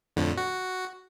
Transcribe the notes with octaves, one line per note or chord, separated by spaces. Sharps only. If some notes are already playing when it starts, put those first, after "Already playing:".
F2 A2 D3
F#4